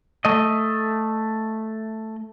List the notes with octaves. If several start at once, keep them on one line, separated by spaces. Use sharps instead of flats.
A3 D#5